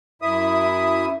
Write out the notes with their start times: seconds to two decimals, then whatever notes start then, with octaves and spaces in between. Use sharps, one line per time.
0.22 F#2 E4 E5 D#6